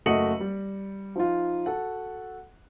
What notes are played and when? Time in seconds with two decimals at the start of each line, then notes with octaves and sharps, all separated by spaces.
0.06 F#1 A3 F#4 D#5 C#7 F#7
0.40 G3
1.16 F3 D#4 F4
1.66 F#4 A4 F#5